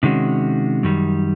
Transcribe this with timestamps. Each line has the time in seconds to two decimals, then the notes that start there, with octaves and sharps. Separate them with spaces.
0.03 C3 D#3 G#3 C#4 F#4
0.83 F#2 D#3 G3